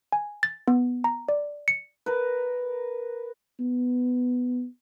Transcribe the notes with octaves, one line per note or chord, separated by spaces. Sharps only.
G#5
A6
B3
A#5
D5
C#7
A#4 B4
B3